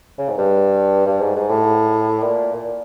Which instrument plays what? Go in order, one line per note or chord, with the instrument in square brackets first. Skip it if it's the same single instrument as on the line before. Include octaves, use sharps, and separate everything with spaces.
[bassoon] C#3
G#2
G2
G2
G#2
G#2
A2
A#2
A#2